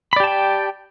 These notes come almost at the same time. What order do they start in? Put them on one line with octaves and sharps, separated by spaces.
B5 D5 G4 A5 G5